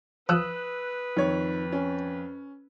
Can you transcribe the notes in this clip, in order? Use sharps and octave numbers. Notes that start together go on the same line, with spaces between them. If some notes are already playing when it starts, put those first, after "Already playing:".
F3 B4 D#6 E6 F#6
F2 D#3 C#5
C#4